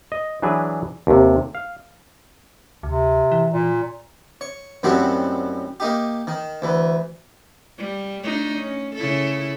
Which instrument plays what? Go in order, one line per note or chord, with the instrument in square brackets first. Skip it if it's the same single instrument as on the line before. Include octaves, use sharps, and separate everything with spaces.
[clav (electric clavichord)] D#5
E3 F#3 D4 G#4 B4
D#2 C3
F5
[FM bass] D2 [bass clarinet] C3
[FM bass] E3
[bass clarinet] A#2
[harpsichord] C#5
F#2 A2 D#3 G3 C4 F#4
A#3 D#4 G4
D#3
D2 E3
[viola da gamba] G3
A3 D4 D#4
C#4
C#3 E4 A4